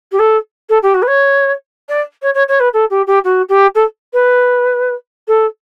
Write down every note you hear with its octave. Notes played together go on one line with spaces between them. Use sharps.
G4
A4
A4
G4
F#4
B4
C#5
D5
C#5
C#5
C#5
B4
A4
G4
G4
F#4
G4
A4
B4
A4